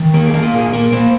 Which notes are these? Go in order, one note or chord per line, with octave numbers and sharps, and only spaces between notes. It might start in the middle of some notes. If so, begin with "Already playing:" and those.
Already playing: D#3
A#3 A#4
G#4
A#3
F4
A#2 G#4
A#3 A#4
A#3 C5